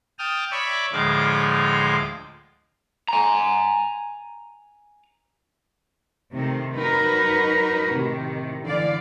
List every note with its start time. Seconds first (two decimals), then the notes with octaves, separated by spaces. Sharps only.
0.19 G5 A5 D#6 F6
0.51 C#5 D5 E5 B5 C#6 D6
0.92 D2 A2 F3 G#3 F4 D6
3.09 G#5 A#5
6.32 C3 D#3 A3 C4
6.75 F#3 D#4 F#4 A#4 B4
7.90 A2 C3 D#3
8.64 D3 E3 D5 F5